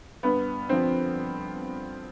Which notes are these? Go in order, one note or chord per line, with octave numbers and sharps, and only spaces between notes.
G2 B3
D3 F3 C4